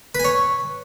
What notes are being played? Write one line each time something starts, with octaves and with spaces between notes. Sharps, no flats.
B4 C#5 G#5